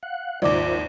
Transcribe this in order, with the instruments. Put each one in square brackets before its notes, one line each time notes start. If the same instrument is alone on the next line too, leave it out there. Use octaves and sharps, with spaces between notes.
[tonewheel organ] F5 F#5 F#6
[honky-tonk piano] G#1 D#2 [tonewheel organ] F4 C5 E5 [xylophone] D5 D6